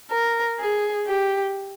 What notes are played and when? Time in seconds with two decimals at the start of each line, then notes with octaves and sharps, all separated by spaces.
0.12 A#4
0.60 G#4
1.07 G4